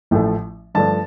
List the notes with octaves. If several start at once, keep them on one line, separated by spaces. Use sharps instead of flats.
A1 A2 F3 A3
G2 F3 A3 D4 A5